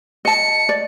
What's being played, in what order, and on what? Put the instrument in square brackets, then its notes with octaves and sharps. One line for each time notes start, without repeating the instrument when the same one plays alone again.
[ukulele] D#5 A5 [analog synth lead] C#7
[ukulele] D5